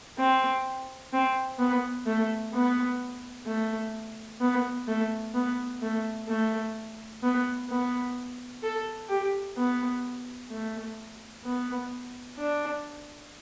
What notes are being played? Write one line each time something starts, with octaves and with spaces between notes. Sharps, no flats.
C4
C4
B3
A3
B3
A3
B3
A3
B3
A3
A3
B3
B3
A4
G4
B3
A3
B3
D4